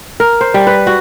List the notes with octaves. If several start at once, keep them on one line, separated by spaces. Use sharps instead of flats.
A#4
C5
G3
B4
F#4